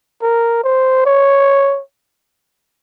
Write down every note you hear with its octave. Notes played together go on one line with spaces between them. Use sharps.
A#4
C5
C#5